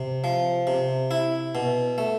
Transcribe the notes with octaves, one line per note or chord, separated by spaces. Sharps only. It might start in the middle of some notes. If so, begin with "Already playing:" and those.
Already playing: C3
F3
C3
E4
B2
A3